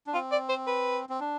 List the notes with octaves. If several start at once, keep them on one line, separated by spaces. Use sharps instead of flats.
D4
C4 F4
D5
C5
B4
C4
D4